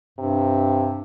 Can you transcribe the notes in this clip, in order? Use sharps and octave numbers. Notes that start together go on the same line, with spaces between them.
G2 C3